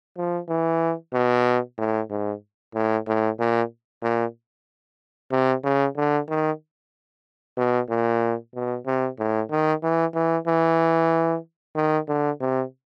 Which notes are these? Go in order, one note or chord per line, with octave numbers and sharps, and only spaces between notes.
F3
E3
B2
A2
G#2
A2
A2
A#2
A#2
C3
C#3
D3
D#3
B2
A#2
B2
C3
A2
D#3
E3
E3
E3
D#3
D3
C3